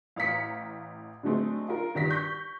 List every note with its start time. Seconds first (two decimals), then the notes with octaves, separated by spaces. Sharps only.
0.16 A1 F5 A#5 B6 C#7
1.23 D3 F#3 G#3 A3 C4
1.69 F4 A#4
1.95 G2 D#3 A#6 B6
2.10 C#6 G6 B6